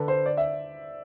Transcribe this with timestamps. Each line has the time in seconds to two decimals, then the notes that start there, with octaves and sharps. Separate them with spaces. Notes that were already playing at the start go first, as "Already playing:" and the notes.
Already playing: D3 A4 B4
0.08 C5
0.26 D5
0.37 E5